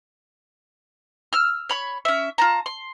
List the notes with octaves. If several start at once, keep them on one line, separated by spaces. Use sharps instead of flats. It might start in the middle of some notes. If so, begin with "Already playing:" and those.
E6 F6
C#5 B5 C#6
C#4 E5
F4 A5 A#5
C6